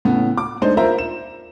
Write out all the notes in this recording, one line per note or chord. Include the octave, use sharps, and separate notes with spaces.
A2 C#3 B3
D6
G#3 A3 D4 D#4 C5 D#5
F4 A#4 C5 E5 A#5
E7